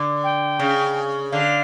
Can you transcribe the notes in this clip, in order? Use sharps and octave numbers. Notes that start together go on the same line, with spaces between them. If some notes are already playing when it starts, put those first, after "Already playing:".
Already playing: D3
G5
C#3
D3 F5